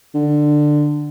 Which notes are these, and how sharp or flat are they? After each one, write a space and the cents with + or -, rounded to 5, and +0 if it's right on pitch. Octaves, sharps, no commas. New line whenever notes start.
D3 +15